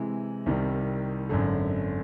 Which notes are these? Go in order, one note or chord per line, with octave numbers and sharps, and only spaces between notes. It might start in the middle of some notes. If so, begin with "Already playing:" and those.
Already playing: C3 E3 G#3
C2 C3 D#3 G3
G#1 F#2 D3